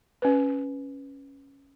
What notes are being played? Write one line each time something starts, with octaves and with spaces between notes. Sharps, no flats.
C#4 B4